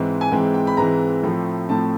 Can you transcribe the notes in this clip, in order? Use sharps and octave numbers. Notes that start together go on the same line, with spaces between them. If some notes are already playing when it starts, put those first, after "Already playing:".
Already playing: G#2 E3 G#3 C4
G#5
G#2 E3 G#3 C4 G5
G5
B5
G#2 E3 G#3 C4 A#5
A2 F3 A3 C4
A2 F3 A3 C4 A5